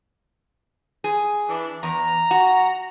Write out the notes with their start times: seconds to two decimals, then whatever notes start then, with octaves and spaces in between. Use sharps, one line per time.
1.04 G#4
1.49 E3 D4
1.83 E2 A#5
2.31 F#4